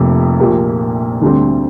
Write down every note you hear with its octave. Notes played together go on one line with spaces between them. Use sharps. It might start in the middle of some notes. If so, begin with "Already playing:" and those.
Already playing: F1 F2 C3 A#3
A#1 A#2 A#3 G4 A#4
D2 D3 G3 C4